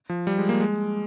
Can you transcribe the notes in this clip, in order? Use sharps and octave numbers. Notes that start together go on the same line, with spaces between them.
F3
G3
G#3
A#3
G#3